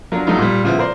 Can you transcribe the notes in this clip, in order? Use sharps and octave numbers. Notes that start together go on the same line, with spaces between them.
F#3 D4 F4 A#4
F#3 G3 A3 D#4 F4
A#2 G3
A#2 C#3 F3 B3 E4
A#4 C5 D5